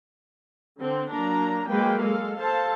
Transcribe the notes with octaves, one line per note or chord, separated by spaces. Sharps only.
D3 C4
F#3 A#3 D4 A#5
F#3 G#3 A#3 B4 G5
G#3 A4 F5
A4 C5 F5 A5